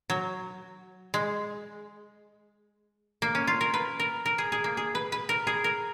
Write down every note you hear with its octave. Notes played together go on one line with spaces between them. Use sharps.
F#3
G#3
A#3
C#4
F4
A#4
B4
A#4
A#4
G#4
G#4
A#3
G#4
B4
B4
A#4
G#4
A#4